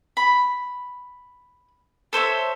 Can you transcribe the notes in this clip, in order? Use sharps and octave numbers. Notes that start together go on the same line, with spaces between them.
B5
A4 C5 C#5 E5